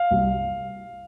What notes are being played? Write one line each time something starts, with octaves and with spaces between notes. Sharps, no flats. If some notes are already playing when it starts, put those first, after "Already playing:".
Already playing: F5
C2